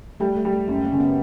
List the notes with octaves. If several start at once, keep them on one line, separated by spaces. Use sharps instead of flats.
G3 A3
A3
G3
A3
F#2 A#3
A#3
C#3
B3